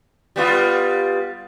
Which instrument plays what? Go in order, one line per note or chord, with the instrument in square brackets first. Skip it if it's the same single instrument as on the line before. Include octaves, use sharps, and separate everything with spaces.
[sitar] G3 B3 F4